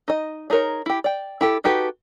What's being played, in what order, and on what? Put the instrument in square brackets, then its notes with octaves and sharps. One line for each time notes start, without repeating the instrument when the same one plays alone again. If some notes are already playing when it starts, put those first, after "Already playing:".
[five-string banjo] D#4 D#5
D4 D#4 G#4 A#4 C#5
E4 G4
D5 G5
E4 G4 A4
D#4 F#4 G4 A4 B4